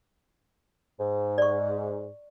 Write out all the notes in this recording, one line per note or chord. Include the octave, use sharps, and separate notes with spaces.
G#2
D5 C#6